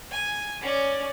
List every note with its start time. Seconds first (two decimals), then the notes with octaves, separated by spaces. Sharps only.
0.11 G#5
0.61 C#4 D5